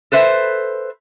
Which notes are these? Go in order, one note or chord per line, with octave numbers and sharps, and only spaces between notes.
A4 B4 C5 E5